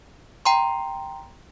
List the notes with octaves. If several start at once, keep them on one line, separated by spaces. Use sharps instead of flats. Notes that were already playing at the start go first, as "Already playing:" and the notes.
G5 A#5 C6